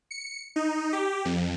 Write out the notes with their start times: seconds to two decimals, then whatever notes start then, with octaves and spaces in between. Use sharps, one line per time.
0.11 C#7
0.56 D#4
0.93 G4
1.25 F2